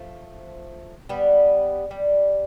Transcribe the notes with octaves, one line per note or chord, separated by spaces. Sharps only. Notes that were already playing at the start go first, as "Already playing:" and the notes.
Already playing: F3 A3
G3 B3
G3